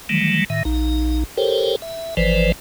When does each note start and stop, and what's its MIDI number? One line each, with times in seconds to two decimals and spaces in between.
0.09 0.44 51
0.09 0.44 52
0.09 0.44 54
0.09 0.44 55
0.09 0.44 57
0.50 0.63 45
0.50 0.63 51
0.50 0.63 76
0.65 1.24 34
0.65 1.24 63
1.37 1.76 67
1.37 1.76 69
1.37 1.76 70
1.37 1.76 72
1.37 1.76 73
1.37 1.76 79
1.82 2.15 76
2.17 2.52 32
2.17 2.52 52
2.17 2.52 53
2.17 2.52 71
2.17 2.52 72
2.17 2.52 74